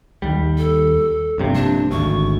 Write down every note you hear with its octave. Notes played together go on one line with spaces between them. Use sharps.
D#2 G3
A4
A#1 G2 C3
D4
G#1 D2 C#6